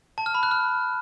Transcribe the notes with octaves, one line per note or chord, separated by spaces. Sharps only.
A5
F6
B5
F#6
F6